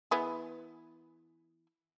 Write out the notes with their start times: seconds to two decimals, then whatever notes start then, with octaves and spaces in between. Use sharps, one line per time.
0.11 E3 B3 G#4